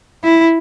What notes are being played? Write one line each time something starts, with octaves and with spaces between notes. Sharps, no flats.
E4